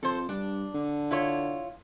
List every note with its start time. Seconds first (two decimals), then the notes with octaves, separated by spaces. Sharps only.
0.03 F2 A4 C5
0.29 G2 D4
0.75 D3
1.11 E4 F4 C#5